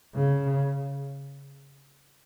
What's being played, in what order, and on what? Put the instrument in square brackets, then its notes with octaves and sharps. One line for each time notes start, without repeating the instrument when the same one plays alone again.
[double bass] C#3